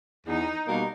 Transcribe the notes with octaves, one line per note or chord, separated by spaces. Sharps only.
E2 D#4
B2 G3 A#3 D#4